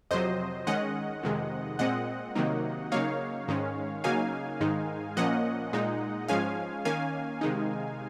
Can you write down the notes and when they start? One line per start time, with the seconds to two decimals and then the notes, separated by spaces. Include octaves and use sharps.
0.11 F2 C3 F#3 C5 D#5
0.67 D#3 G#3 C#4 D#5 F#5
1.23 F2 C3 D#3 G#3
1.79 A#2 G#3 C4 D#5 F#5
2.35 C3 D#3 F#3 A#3 D#4
2.92 C#3 F#3 A#3 D#4 C#5 F5
3.48 G#2 D#3 G#3 C#4
4.04 C#3 F#3 A#3 D#4 F5 G#5
4.61 G#2 D#3 G#3 D#4
5.17 A#2 F3 A#3 C#4 D#5 F#5
5.73 A#2 G#3 D#4
6.28 G#2 F3 G#3 C#4 F5 G#5
6.85 D#3 A#3 C#4 F5 G#5
7.41 C3 D#3 G#3 D#4